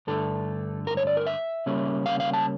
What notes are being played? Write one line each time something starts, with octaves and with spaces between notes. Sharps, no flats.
G2 D3 A3 D4 A4
A#4
C#5
D5
A#4
E5
C#3 G3 A#3 C#4
F5
F5
A5